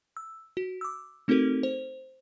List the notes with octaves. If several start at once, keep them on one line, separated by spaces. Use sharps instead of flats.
E6
F#4
D6 E6
A3 C4 D#4 F#4 A4 A#4
C5